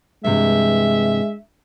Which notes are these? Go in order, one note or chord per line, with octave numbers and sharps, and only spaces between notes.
G2 C3 E3 G#3 E5